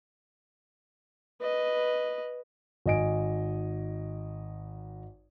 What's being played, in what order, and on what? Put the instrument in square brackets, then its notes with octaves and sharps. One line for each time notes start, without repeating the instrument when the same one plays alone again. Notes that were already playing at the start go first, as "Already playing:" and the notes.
[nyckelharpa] B4 D#5
[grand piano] G#1 D#4 D#5 G#5 D7